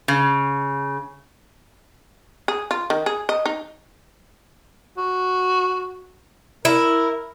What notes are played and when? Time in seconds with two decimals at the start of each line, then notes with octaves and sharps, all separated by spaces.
0.08 C#3
2.48 G#4
2.71 F4
2.90 D#3
3.06 G#4
3.29 D#5
3.46 D#4
4.98 F#4
6.65 E4 A#4